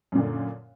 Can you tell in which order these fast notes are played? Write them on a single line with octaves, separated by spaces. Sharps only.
F#2 A#2 D3